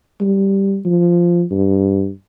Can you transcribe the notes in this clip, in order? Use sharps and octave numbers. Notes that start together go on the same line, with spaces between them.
G3
F3
G2